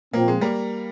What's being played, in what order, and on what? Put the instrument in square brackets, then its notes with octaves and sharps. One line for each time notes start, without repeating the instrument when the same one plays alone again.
[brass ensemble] A#2 F3 C4 [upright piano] A#3
[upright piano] G#3
G3 A#3